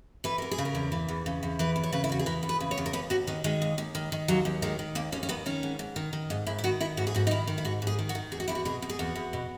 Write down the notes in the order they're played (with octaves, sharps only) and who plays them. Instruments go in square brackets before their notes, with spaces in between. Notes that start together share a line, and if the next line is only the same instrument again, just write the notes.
[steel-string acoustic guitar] E3 B4
E2 A#4
G#4
C#3
A#4
E2
E3
E2
C#3
E2
E3 B4
E2
C#5
C#3 B4
E4
E2 F#4
G#4
E3 A#4
E2
B4
C#3
C#5
E2
A#4
D#2 B4
D#2 F#4
D#3 B3
D#3 G#3
D#2
D#2
D#3
D#3
D#2 F#3
D#2
D#3 G#3
D#3
D#2 A#3
D#2 C#4
C#4
D#3 B3
D#3 C#4
G#2
G#2
D#3
D#3
G#2 D#4
G#2 E4
E4
D#3 F#4
D#3 E4
G#2 F#4
G#4
G#2 F#4
D#4
D#3 E4
D#3
E4
G#2 F#4
G#2
G#4
D#3
F#4
D#3
E2 G#4
F#4
E2 E4
F#4
B2 G#4
B2
G#4
E2 F#4
E2
B2